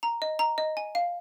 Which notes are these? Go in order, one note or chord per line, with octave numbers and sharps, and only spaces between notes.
A#5
D#5
A#5
D#5
G#5
F5